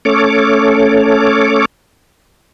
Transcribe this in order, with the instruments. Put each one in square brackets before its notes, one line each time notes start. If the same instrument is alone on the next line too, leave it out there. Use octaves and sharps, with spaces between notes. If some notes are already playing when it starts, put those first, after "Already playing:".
[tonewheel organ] A3 C#4 A4 C#5 D6